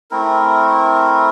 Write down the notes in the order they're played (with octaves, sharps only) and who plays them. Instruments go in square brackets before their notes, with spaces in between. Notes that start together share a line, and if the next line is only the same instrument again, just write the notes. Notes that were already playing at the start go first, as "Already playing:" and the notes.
[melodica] A3 C4 E4 A#4